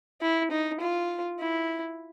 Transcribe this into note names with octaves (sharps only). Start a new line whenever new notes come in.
E4
D#4
F4
E4